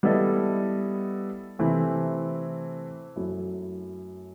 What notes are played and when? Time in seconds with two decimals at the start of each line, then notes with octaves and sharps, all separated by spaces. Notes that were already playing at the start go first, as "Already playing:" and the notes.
0.03 G3 B3 E4 A4 D#5
1.59 C3 E3 A3 C4 E4
3.16 F#2 F#3 A3 E4